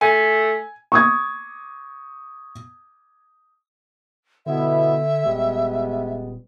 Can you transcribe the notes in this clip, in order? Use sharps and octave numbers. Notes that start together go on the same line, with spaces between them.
A3 G#5
C#6 D#6 G#6
B2 D3 B3 E4 E5
D#1 G3 G#3 B3